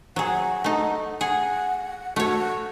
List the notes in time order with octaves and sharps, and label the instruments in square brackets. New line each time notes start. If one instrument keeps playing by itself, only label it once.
[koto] F#3 G#4 [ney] F#5
[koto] A3 D#4
[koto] G#4 [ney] F#5
[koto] A3 C#5 [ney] F#4